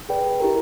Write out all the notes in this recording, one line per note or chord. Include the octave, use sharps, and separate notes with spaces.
G#4 B4 D5 G5
E4 G4 A#4